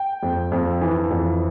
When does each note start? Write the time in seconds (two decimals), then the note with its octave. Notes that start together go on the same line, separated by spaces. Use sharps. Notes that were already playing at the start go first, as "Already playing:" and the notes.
Already playing: G5
0.23 F2
0.52 F2
0.81 E3
1.11 F2